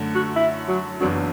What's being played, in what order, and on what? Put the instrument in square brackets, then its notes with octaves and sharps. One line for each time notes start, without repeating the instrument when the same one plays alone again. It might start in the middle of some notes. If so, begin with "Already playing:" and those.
Already playing: [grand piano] F#2 D3 A3
[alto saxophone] F#4
E4
F#3
[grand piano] F#1 F#2 E3 B3 D4 [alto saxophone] F#3